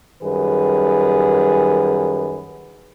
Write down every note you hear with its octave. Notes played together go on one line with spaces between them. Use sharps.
F#2 D#3 G3 G#4 B4